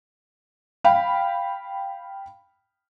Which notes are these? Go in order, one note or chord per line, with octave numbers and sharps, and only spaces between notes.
F5 G5 B5